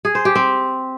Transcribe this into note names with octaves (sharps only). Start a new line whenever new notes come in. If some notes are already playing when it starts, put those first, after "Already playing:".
G#4
C5
G4
C4